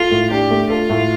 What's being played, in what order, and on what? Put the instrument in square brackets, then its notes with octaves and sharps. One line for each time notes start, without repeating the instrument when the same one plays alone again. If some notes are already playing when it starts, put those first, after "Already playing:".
Already playing: [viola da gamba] F4 [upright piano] A4
[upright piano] A2
[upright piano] D4 [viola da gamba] G4
[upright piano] A3
[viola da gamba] F4 [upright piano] A4
[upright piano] A2